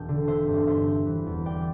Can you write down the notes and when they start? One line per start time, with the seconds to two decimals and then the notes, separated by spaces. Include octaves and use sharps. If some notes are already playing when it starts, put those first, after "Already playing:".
Already playing: E1 G5 A5
0.09 D3
0.28 C4 C5 E5
0.47 G2
0.67 C4 C5 E5
0.86 C4
1.06 E3
1.26 E2
1.45 C4 D5 G5